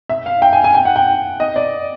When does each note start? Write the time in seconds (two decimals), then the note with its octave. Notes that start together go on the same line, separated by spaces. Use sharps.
0.09 E5
0.26 F5
0.42 G5
0.53 G#5
0.64 G#5
0.75 G5
0.85 F#5
0.96 G5
1.40 D#5
1.56 D5